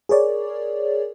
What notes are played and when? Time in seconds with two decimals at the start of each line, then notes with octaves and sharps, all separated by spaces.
0.09 G#4 A#4 C#5 D5